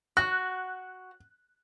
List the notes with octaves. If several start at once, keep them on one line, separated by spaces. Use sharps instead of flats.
F#4 F#6